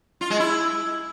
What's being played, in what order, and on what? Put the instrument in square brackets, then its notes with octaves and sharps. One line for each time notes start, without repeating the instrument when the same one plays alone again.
[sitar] F4
G#3
E4